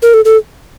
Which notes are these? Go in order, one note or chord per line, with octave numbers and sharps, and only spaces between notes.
A#4
A4
A4